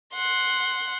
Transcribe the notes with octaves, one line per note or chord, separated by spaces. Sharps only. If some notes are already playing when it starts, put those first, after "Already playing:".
F#5 C6